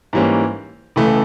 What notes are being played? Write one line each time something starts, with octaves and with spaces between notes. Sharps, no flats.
G#2 E3 G3 A#3 C#4
C#2 C#3 E3 A3